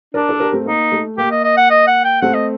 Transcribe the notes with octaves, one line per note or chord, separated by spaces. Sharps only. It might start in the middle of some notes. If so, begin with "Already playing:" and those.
D4 A#4 D5
A4
G4 A#4
A3 C4
A#3 D#4
A3
A#3 G4
D#5
D#5
F#5
D#5
F#5
G5
A3 C4 F#5
D#5